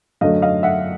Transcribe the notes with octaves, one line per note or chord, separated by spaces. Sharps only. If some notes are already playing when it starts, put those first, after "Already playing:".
F#2 D3 F#3 A3 D#5 F5
D#5 F5
E5 F#5